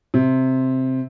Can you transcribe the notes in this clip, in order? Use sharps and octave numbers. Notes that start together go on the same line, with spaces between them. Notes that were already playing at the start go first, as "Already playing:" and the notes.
C3